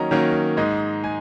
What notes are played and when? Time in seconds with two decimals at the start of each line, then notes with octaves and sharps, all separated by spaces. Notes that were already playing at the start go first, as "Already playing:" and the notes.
Already playing: D#3 F#3 A#3 C#4 D#5 A#5
0.11 D#3 F#3 A#3 C#4
0.57 G#2 G#3 D#4
1.04 G#3 G#5